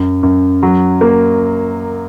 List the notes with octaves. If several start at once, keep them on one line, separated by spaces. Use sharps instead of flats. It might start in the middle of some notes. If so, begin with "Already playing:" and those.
Already playing: F#2
F#2
F#3
A#3